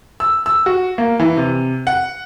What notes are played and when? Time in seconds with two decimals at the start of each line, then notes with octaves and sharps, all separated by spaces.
0.20 E6
0.46 E6
0.66 F#4
0.98 A#3
1.20 E3
1.37 C3
1.87 F#5